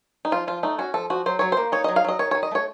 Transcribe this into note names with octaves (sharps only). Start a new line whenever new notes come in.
D#4
F3 F4
F3 F4
A3 D#4
C#4 F#4
F3 A4
F3 F#4
F#3 C5
F#3 C#5
A#3 C5
D#4 C#5
D#5
F#3
F5
F#3 D#5
D#3 C#5
C#5
D#3
D#5
A3 C#5